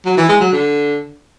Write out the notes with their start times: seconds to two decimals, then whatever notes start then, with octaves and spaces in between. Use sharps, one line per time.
0.06 F#3
0.17 E3
0.29 G#3
0.41 F#3
0.52 D3